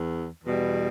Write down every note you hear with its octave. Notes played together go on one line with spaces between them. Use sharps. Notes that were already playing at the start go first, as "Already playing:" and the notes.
Already playing: E2
E2 B2 G3